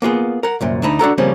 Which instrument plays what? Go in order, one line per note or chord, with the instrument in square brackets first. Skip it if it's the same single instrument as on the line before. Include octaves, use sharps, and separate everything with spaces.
[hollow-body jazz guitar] A#3 B3 F4 G#4
A#4 F#5
C2 F#2 A#2
D2 D4 D#4 B5
D4 F#4 A4 A#5
C#3 F3 G3 A#3 C4 C#4